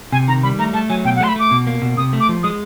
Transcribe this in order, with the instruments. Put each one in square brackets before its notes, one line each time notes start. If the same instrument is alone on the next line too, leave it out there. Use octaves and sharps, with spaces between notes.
[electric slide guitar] C3 [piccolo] G#5
[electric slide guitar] D#3 [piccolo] A#5
[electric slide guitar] G3 [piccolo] B5
[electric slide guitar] A3 [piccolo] A#5
[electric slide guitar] A3 [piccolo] A5
[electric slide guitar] F#3 [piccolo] G#5
[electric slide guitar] B2 [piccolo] G5
[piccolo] F#5
[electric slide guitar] A3 [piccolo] C6
[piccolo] B5
[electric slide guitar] A3 [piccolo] D6
[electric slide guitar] B2
A#3
B2
[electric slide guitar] C3 [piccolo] D#6
[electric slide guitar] A3
[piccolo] D6
[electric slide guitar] F3
[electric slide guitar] G#3 [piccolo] D#6